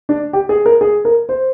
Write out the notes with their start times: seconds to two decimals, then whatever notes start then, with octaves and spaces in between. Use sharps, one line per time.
0.09 D4
0.33 G4
0.49 G#4
0.66 A#4
0.81 G#4
1.05 A#4
1.29 C5